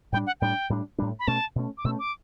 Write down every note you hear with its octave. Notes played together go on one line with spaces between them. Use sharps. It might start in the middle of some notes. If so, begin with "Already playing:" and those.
A2 G3 D4 G5
F#5
A2 G3 D4 G5
A2 G3 D4
A2 G3 D4
B5
B2 A3 C#4 A5
B2 A3 C#4
D6
B2 A3 C#4 E6
D6